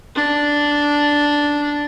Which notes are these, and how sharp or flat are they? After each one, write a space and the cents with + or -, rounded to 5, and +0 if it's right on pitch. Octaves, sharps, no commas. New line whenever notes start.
D4 -5